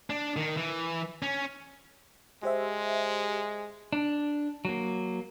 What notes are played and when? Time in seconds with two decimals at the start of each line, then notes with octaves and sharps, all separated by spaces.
0.10 D4
0.36 D#3
0.57 E3
1.22 C#4
2.43 G#3 G4 C5 E5
3.93 D4
4.65 F#3 A#3